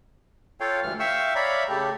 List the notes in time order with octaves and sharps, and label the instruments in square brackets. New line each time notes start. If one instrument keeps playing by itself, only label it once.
[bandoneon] F4 A4 C#5 F5 G5
D2 G2 E3 F6
E5 F5 G5 C#6 E6
C#5 D5 E5 F5 A#5 B5
C#3 A3 G4 A4